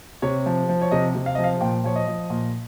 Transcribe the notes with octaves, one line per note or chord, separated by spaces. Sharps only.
C3 C#5
F3
F3
C#5
C3 D#5
C3
F5
F3 D#5
F5
A#2 G5
F3 C#5
D#5
F3
A#2